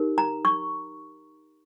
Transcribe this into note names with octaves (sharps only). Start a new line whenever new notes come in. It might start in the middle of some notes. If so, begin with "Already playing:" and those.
Already playing: D#4 G4 A#4
A#5
C#6